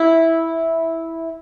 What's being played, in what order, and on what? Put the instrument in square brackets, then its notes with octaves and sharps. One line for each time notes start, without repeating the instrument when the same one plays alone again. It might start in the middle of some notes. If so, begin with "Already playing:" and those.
Already playing: [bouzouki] E4